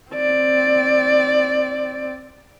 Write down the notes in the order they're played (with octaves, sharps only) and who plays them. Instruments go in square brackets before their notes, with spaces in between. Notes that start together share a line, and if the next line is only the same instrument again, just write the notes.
[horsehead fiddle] C4 D5